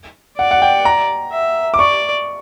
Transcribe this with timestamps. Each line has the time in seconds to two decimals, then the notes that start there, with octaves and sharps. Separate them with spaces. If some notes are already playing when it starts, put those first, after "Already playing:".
0.38 D5 F#5
0.51 F#5
0.62 G5
0.85 A#5
1.32 E5
1.74 D6
1.79 D5 C#6